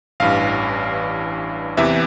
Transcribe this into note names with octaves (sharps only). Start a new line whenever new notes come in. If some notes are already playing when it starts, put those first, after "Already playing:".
A1 G2 E3 F5
E2 C3 E3 E5